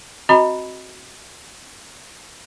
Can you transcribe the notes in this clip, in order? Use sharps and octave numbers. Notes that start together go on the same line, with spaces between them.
C4 F#4 D#5 A#5 B5